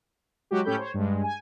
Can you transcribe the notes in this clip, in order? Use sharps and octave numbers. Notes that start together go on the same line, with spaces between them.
F#3 G#3 F#4 G4
A2 C#4 G4 A4 B5 G6
C5 C#5
G2 G#3
G#5